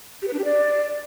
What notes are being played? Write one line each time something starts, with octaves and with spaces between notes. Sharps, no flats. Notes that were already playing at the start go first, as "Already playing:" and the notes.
G4
B4
D4
G4
D5